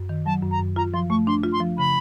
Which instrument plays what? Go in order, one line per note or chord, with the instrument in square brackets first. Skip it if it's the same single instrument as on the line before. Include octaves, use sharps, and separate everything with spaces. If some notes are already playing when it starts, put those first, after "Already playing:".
Already playing: [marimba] F#2
D#3
[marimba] F#3 [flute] A5
[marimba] F#2
[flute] A#5
[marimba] F#2
[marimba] F4 [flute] A#5
[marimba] F3 [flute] C6
[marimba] A3 [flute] C#6
[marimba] D4 [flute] C6
[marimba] F4
[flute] C6
[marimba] F3
[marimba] C#3 [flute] B5